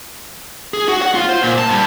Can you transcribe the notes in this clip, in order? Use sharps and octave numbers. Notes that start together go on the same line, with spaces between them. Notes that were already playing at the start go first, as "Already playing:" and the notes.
G#4
F#4
F#5
F4
C5
A#2
A5
G2